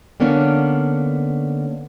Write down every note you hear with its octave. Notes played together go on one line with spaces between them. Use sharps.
D3 A#3 B3 C#4 D4